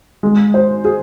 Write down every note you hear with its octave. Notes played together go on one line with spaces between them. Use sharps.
G#3
C5
G#4